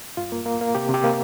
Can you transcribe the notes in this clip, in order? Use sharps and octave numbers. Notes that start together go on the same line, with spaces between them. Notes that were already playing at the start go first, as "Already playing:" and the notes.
G2 F4
A#3
A#3
A#3
C3 G4
C3
G4
A#3